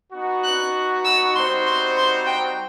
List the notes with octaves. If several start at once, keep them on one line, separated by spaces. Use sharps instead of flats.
B3 D#4 F#4
F#6
E6
G3 C4 D#4 F#4 C5 C6
C6
C6
G5